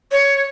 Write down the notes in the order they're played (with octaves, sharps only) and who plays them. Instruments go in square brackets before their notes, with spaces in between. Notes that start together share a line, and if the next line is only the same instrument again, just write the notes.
[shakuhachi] C#5